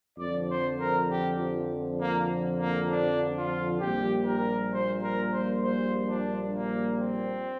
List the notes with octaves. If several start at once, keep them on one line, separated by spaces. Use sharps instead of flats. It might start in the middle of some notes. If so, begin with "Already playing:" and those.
F2 D3 F3 D5
C5
A#4
G4
A#3
A#3
D4
F4
A#1 A#2 G3 G4
A#4
C5
A#4
C5
C5
D4
A#3
C4